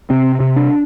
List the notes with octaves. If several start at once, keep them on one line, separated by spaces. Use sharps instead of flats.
C3 C4
C3
D4